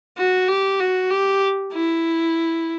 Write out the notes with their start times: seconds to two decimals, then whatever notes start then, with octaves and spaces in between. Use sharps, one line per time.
0.18 F#4
0.49 G4
0.80 F#4
1.11 G4
1.74 E4